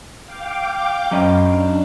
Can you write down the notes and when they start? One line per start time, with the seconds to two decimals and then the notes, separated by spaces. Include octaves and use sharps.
0.24 F5 G5 D6
1.11 F#2 F#3 C#4 D#5
1.47 D4